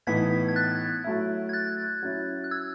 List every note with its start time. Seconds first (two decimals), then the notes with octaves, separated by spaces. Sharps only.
0.07 A2 E3 B3 D#4 G#6 B6
0.48 G#6
0.56 F#6 A6
1.04 F#3 A3 E4
1.49 G#6
1.53 F#6 A6
2.03 F#3 C#4 E4
2.44 F#6
2.51 E6 G#6